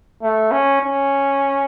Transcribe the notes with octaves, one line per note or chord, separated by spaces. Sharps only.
A3
C#4
C#4